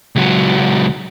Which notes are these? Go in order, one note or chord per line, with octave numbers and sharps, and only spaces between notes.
C#2 F#3